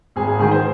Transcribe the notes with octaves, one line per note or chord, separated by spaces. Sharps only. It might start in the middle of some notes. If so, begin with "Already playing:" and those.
G#1 G#4
G#4
G#2 D#3 G#4
C5